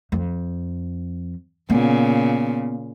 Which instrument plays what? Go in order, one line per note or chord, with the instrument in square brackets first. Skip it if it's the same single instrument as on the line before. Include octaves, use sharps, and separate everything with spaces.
[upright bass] F2
[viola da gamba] A#2 C#3 [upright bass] B3